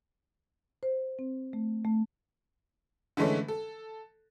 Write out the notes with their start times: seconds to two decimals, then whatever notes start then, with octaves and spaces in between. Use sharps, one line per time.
0.83 C5
1.19 C4
1.53 A3
1.85 A3
3.17 D3 E3 G#3 A3 C#4
3.48 A4